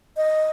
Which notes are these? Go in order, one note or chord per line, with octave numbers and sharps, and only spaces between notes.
D#5